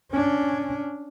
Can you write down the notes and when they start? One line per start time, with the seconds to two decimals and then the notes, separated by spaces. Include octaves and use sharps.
0.12 C#4 D4